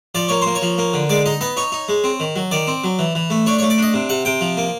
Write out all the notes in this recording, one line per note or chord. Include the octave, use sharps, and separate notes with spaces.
F3 D5
A#3 C#5
A#3 C5
C#5
F3
A#3
D3
G#3 D5
D#4 D#5
B3 D#5
D#4 C#5
D#4
G#3
C4
D#3
F#3
D#3 D5
C4
F#3
E3
E3
A3
D4 C#5
C#5
A3
D5
D4 D#5
C3
C3 F#5
C3 G5
F3
A#3